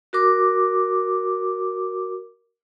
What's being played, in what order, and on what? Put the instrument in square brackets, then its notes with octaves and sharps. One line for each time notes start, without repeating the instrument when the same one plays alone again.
[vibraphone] F#4 A#4 D6